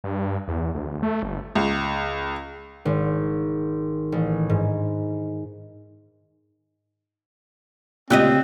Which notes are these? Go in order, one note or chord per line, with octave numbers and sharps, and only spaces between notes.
G2
E2
D2
A3
G1
C#2
G#1
A1
G#2
D2 A#2 C#3 C4 G4 D#5 F#6